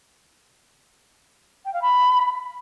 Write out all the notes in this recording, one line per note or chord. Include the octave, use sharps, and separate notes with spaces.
G5
F5
B5